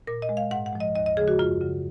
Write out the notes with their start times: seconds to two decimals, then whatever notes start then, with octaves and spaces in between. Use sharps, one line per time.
0.07 A#2 A#4
0.22 D#5
0.29 G#3
0.37 F5
0.51 G#2 F#5
0.66 F#5
0.73 F3 G#3
0.80 D#5
0.95 D#2 D#5
1.06 D#5
1.17 C#3 F3 G#3 G#4
1.28 F#4
1.39 F#2 F4
1.61 C#3 F#3